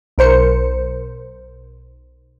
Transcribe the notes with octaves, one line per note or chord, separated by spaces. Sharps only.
B1 A#4 C5 C#7